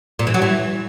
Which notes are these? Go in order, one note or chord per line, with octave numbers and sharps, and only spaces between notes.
A#2
E3
F#3
E3